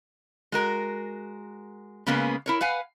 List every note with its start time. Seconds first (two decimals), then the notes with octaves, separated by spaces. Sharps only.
0.52 G#3 F#4 A#4
2.06 C#3 G#3 A#3 B3 C#4 G#4
2.46 E4 A#4 C#5
2.61 B4 F5 F#5 G#5